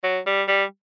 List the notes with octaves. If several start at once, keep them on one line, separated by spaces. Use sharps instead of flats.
F#3
G3
G3